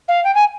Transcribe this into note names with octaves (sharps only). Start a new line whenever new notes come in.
F5
G5
G#5